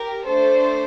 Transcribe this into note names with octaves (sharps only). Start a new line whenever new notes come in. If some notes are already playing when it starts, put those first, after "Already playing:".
Already playing: G4 A#4
A3 D4 A4 C5